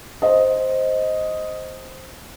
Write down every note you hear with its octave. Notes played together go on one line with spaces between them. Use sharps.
C5 D#5